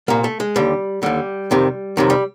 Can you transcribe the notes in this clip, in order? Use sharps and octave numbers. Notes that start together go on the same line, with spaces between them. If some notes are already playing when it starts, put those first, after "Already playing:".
C2 A#2 A#3
A3
G#3
D#2 D3 G3
D#2 D3 G3
F2 C3 D#3
F2 C3 D#3 F#3
G3